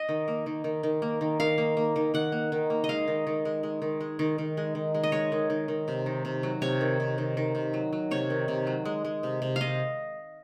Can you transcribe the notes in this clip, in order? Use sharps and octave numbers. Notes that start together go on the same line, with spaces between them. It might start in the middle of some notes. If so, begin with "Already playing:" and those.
Already playing: D#5
D#3
A#3
D#3
D#3
D#3
A#3
D#3
D#3 F5
A#3
A#3
D#3
D#3 F#5
A#3
D#3
A#3
D#5
G#3 F5
D#3
D#3
G#3
G#3
D#3
G#3
D#3
D#3
G#3
D#3
G#3
D#5
G#3 C#5
D#3
D#3
D#3
C3
D#3
C3
F#3
C3 C#5
D#3
C3
D#3
D#3
C3
F#3
F#3
C3 C#5
D#3
C3
F#3
G#3
G#3
C3
C3
C3 D#5 F5